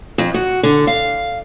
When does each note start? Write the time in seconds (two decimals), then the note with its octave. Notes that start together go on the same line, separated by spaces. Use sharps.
0.18 F2
0.34 F#4
0.63 D3
0.87 F5